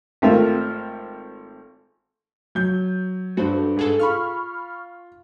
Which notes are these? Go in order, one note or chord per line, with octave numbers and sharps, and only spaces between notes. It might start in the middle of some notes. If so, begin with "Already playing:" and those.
G#1 A3 C4 F4 A#4 E5
F#3 G6
G2 F#4 A4 C5
G#2 G#4 A4
F4 B5 C#6 F6